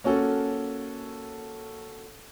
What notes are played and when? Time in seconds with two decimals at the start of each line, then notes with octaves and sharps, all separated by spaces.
0.04 A#3 C#4 F#4 A4